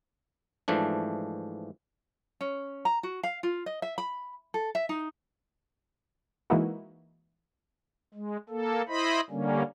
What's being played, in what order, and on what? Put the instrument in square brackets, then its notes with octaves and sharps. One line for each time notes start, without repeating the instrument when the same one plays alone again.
[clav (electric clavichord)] G#2 E3 F3 A3 D4
[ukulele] C#4
A#5
F#4
F5
F4
D#5
E5
B5
A4
E5
D#4
[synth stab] E3 G#3 A#3 D#4 E4 F#4
[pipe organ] G#3
A#3 A4
E4 C5 D#5 B5
D3 G3 A#3 C#4